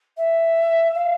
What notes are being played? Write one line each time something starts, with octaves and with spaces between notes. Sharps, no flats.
E5
F5